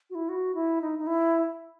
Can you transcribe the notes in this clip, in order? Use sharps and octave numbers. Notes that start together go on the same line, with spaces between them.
F#4
E4
F#4
E4
D#4
D#4
E4